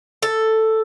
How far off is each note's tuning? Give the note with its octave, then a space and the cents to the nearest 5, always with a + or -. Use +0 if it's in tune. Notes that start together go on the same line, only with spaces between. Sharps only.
A4 +5